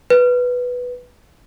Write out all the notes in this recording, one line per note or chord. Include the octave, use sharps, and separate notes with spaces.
B4